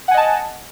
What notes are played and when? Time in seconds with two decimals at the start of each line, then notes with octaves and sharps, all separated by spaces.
0.08 F#5
0.11 G#5
0.14 D#5
0.17 A5